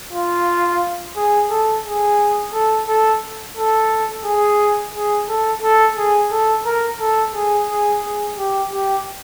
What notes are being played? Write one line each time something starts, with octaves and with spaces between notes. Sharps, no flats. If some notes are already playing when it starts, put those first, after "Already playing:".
F4
G#4
A4
G#4
A4
A4
A4
G#4
G#4
A4
A4
G#4
A4
A#4
A4
G#4
G#4
G#4
G4
G4